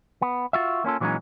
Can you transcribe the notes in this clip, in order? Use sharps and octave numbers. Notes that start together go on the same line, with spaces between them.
B3
F4 F#4 E5
A#3 C#4 F4 A4
A#2 E3 F#3 G#3 C#4 D#4